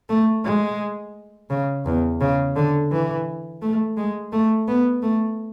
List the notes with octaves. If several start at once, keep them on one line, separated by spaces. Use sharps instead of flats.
A3
G#3
C#3
E2
C#3
D3
E3
A3
G#3
A3
B3
A3